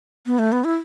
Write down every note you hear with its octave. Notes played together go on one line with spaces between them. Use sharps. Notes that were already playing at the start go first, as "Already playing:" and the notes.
B3
A3
B3
E4